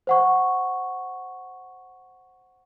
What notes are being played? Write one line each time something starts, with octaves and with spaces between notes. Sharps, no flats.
C5 F#5 C#6